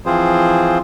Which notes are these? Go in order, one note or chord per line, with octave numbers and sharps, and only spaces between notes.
E3 F3 C4 F4 G#4 C5